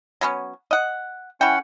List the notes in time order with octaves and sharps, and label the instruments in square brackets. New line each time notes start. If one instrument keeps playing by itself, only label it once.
[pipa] F#3 B3 C#4
D#5 F#5
[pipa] E3 G5 [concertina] C#4 F#5